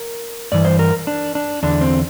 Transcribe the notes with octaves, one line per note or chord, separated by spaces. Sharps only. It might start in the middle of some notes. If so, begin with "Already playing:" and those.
Already playing: A#4
G2 E3 D5
C5
A#4
D4
D4
E2 D3 D4
C4